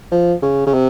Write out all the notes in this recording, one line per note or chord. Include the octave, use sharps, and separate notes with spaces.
F3
C#3
C#3
C3